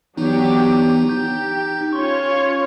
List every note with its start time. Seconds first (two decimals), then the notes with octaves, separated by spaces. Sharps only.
0.17 E3 F#3 B3 D4 D#4 G4
1.07 D#4 G4 G6
1.93 C#4 F4 C#5 C6 C#6